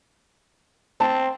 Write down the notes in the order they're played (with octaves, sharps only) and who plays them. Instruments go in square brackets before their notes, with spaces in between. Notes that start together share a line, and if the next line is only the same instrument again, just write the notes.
[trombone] C4 [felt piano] A5